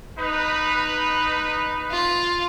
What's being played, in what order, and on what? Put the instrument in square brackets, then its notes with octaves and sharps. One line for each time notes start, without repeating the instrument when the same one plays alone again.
[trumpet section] D#4 B4
[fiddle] F4